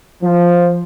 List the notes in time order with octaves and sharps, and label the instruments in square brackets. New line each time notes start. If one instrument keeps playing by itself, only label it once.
[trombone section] F3